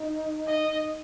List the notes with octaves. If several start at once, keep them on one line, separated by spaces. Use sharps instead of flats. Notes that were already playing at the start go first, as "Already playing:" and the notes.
Already playing: D#4
D#5